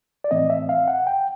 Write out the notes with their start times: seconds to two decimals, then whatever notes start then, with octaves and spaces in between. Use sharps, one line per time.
0.24 D5
0.31 A2 E3 A3 C4 D#5
0.50 E5
0.69 F5
0.88 F#5
1.07 G5